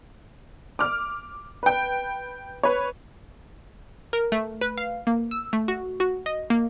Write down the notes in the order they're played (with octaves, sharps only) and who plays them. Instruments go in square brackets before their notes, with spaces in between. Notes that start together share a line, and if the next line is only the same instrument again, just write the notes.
[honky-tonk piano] D6 F6
B4 G5
B4 C#5
[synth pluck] A#4
A3
B4
F5
A#3
E6
A3
F#4
F#4
D#5
A#3